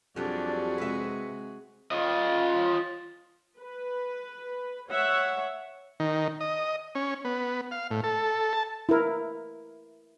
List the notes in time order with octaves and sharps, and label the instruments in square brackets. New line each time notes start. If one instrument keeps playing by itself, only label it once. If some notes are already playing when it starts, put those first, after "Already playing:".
[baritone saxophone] F2 [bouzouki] F#3 G3 [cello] D4 [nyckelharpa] F#4 G#4
[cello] C3 G#3 [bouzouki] B4 E5
[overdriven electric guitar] F4 D#5
[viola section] B4
C#5 E5 F#5
[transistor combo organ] D#3
D#5
C#4
B3
F5
A2
A4
A5
[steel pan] E4 A#4